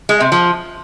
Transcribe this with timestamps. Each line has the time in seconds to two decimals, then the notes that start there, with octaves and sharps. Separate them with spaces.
0.09 G#3
0.20 C3
0.32 F3